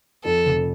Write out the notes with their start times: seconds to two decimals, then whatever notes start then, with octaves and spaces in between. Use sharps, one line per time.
0.25 F2 A4
0.46 F1